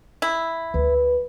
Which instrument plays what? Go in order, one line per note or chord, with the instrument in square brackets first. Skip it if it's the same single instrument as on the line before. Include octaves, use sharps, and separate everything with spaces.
[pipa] E4
[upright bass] D2 [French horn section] B4